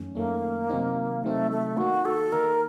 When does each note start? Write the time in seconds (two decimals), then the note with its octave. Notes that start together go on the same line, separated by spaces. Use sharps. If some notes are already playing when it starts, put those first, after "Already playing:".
Already playing: F#2 D#3 A3 C#4
0.15 F#2 D#3 A3 A#3 C#4
0.69 C3 D#3 F#3 C4 D#4
1.24 C3 D#3 F#3 A3 C4 D#4
1.51 A3
1.77 D#3 A#3 D#4 F#4
2.05 A4
2.32 D#3 A#3 D#4 A#4